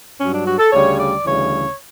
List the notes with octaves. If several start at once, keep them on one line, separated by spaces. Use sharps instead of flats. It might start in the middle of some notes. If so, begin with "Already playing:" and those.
G2 F#3 C#4
D4
F#4
A4
D2 C#3 G3 C#5
D5
D2 C#3 E3 G3 C#5